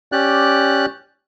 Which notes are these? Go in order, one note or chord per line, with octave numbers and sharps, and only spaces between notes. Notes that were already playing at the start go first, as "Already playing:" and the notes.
C#4 G4 D5 F#6